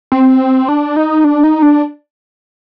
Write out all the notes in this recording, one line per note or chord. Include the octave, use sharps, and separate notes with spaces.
C4
D4
D#4
D4
D#4
D4